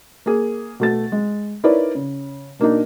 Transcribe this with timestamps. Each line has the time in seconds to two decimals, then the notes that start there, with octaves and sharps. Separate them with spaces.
0.26 A#3 G#4
0.80 B2 A3 A6
1.12 G#3
1.64 D#4 E4 A#4 B4 C#5 D5
1.95 C#3
2.59 B2 A#3 D4 D#4